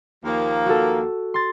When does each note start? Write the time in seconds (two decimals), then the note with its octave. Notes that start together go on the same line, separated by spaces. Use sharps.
0.24 D#2 F3 A#3
0.66 F#4 A4
1.34 C6 A6